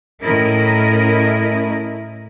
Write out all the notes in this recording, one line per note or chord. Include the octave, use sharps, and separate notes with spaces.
A2 C#4 E4 A#4 D#5